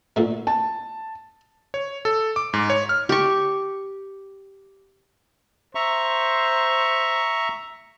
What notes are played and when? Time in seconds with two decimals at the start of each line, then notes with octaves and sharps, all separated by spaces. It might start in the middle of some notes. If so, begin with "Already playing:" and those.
0.16 A#2 D3 A3
0.47 A5
1.74 C#5
2.05 A4
2.36 D6
2.53 G#2
2.70 C#5
2.89 F6
3.09 G4 C#6
5.75 C5 E5 A#5 C#6